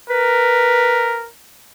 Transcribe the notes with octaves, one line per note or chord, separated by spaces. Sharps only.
A#4 B4